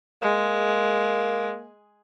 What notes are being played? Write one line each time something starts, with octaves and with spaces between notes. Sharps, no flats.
G#3 A#3